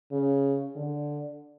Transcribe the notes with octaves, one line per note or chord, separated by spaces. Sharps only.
C#3
D3